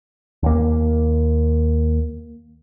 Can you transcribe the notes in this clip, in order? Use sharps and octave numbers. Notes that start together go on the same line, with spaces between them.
D#2 A#3